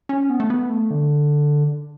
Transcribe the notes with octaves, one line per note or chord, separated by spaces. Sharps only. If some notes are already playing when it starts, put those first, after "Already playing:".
C#4
B3
A3
B3
A3
D3